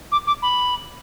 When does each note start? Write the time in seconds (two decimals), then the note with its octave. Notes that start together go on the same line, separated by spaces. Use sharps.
0.12 D6
0.27 D6
0.42 B5